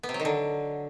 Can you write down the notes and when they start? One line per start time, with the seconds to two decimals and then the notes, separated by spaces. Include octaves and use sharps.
0.03 B3
0.09 C3
0.14 F#3
0.20 D#3
0.25 D3